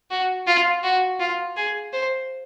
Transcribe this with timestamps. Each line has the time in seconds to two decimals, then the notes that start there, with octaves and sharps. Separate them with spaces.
0.10 F#4
0.47 F4
0.83 F#4
1.20 F4
1.57 G#4
1.93 C5